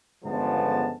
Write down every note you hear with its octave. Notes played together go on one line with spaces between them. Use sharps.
G1 C#3 F3 G#3 B3 A5